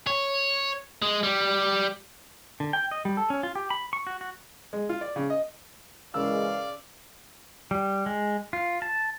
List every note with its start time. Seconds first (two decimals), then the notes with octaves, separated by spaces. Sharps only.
0.07 C#5
1.02 G#3
1.23 G3
2.60 D3
2.73 G5
2.91 D#5
3.05 G3
3.17 A4
3.30 C#4
3.43 F4
3.55 G4
3.70 B5
3.93 C#6
4.07 F#4
4.21 F#4
4.73 G#3
4.89 F4
5.01 D5
5.16 C#3
5.30 D#5
6.14 C#3 E3 G#3 A#4 D5 F5 E6
7.71 G3
8.06 G#3
8.53 F4
8.82 A5